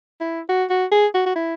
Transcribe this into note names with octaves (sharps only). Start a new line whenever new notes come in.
E4
F#4
F#4
G#4
F#4
F#4
E4